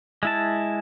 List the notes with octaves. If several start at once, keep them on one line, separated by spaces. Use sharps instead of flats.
G#3 E4 A5